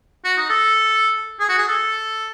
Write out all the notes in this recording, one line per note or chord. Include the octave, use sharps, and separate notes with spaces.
F#4
D#4
A4
G#4
F#4
G#4
A4